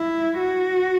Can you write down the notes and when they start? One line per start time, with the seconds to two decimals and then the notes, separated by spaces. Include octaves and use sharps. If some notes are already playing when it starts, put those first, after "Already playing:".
Already playing: E4
0.39 F#4